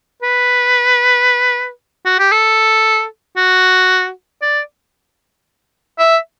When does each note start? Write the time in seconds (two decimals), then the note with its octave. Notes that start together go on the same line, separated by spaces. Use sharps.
0.22 B4
2.05 F#4
2.19 G4
2.32 A4
3.37 F#4
4.42 D5
5.99 E5